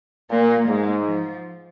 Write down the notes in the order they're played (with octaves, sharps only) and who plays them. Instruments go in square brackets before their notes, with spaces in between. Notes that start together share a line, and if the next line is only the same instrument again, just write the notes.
[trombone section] A#2 [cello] A#3
[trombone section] G#2 [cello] G#3
[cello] F3